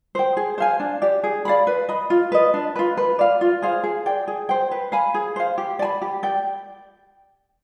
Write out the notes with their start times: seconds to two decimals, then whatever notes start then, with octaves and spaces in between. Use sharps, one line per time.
0.15 C5 G5
0.37 G#4
0.58 C5 F5 G#5
0.80 D4
1.02 G4 D5
1.24 G#4
1.45 D5 F5 B5
1.67 B4
1.89 D#5 B5
2.10 F4
2.32 B4 D#5
2.54 D4
2.76 F4 B4
2.97 B4
3.19 D5 F5
3.41 F4
3.62 G#4 C5 F5
3.83 G#4
4.06 D5 G5
4.28 G#4
4.49 C5 G5
4.71 B4
4.92 F5 G#5 B5
5.14 G#4
5.36 C5 F5
5.58 G4
5.79 D5 G#5 B5
6.02 G4
6.23 D5 G5